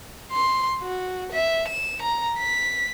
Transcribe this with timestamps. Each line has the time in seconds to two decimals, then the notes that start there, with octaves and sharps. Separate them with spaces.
0.32 C6
0.82 F#4
1.32 E5
1.68 E7
2.02 A#5
2.39 B6